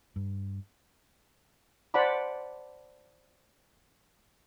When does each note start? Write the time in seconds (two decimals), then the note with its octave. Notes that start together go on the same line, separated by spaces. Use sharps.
0.16 G2
1.94 C5 D5 F#5 A5 B5 D6